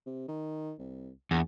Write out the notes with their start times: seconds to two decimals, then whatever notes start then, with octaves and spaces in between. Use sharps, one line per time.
0.06 C3
0.28 D#3
0.79 C2
1.31 A#1 E2